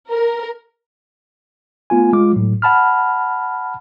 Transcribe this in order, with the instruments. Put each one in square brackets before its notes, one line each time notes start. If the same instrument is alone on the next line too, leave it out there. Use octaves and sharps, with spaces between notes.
[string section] A#4
[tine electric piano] A3 B3 F4 G#5
G#3 F4 D6
A2 F#3
F#5 A5 B5 F6